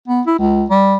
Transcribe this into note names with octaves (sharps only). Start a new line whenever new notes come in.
B3
E4
C#2
G3